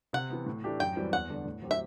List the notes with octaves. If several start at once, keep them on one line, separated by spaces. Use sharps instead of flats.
C3 F#5
E3 B3
A2
E3 A3 D4 G4
F#2 G5
E3 G3 C4 F#4
E2 F#5
D3 G3 D4
A2
F#3 C4 G4
E5